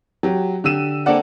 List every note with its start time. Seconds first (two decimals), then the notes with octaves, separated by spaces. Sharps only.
0.23 F#3 G4
0.64 D3 G4 E6 D#7 E7
1.06 A#3 C4 D4 A4 D5 F#5